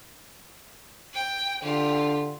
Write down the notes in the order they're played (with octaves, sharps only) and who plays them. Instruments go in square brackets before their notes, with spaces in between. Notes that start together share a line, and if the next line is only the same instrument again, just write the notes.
[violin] G5
[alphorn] D3 [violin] F4 G4